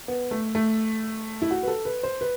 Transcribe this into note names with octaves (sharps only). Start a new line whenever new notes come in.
B3
A3
A3
E4
F#4
B4
A4
B4
C5
B4